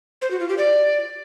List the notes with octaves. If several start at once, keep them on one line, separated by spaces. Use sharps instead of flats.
C5
F#4
F4
G4
D5